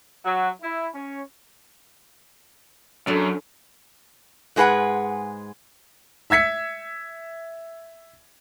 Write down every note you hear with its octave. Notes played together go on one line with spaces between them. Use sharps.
F#3
E4
C#4
F#2 D4 A4
G#2 G#3 G#4 B4 F#5 G#5
E5 E6 G#6 B6 C#7